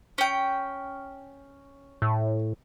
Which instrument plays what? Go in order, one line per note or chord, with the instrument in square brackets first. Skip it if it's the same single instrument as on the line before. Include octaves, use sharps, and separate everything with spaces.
[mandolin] C#4 G5
[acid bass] A2